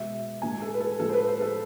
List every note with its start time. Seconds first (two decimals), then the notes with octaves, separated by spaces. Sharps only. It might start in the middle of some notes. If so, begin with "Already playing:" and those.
Already playing: B2 G#3 E5
0.42 A2 G#3 G#5
0.62 A4
0.74 B4
0.80 A4
0.99 A2 F3 G#3 A4
1.09 C5
1.14 B4
1.28 C5
1.41 A4